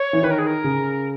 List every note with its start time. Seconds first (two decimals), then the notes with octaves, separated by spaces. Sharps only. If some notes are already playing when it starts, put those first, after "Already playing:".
Already playing: C#5
0.13 E3
0.23 D#3 B4
0.31 A#4
0.38 G#4
0.46 A#4
0.64 C#3